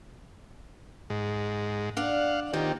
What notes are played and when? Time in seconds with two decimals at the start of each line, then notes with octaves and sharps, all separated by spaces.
1.10 G#2
1.97 D4 D5 F5 F#5
2.53 D#3 A#3 C4 F4 G4